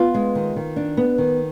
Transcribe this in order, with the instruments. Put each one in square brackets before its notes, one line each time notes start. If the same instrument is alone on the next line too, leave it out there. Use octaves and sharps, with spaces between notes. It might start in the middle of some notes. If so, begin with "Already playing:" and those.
Already playing: [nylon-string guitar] B3 F4
G#3
D#3
D#3
D4
B3
D#3